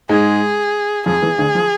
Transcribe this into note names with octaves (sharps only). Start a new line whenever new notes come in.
G#2 G#3 G#4
F2 F3 G#4
E2 E3
D2 D3
F3